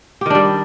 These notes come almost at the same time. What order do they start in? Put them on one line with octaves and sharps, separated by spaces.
G4 D#3 D4 G3